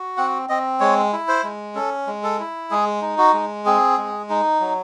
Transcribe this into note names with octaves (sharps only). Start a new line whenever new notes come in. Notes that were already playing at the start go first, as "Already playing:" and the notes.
Already playing: F#4
C4 F#5
C4 D#5
G#3 C#5
E4
C5
G#3
C#4 A4
G#3
A4
E4
G#3 G#4
D#4
F#4
G#3
C4 G#4
G#3
D#4
F#3